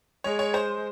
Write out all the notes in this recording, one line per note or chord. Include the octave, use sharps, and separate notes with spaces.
G#3 C#5
C#5
C5